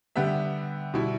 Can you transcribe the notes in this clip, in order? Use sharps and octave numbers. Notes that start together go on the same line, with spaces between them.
D3 G3 B3 G4 E5
B2 G3 E4